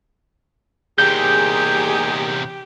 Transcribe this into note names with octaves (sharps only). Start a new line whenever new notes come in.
E2 C3 A#3 D#4 G4 G#4 G6